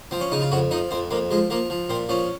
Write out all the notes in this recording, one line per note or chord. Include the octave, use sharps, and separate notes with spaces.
F3 C4
C#4
C#3 D#4
F4
F2 F#4
F3 D#4
F2 C4
F2 A#3
F3 G#3
F3 A#3
F3
A#2 C4
F3 C#4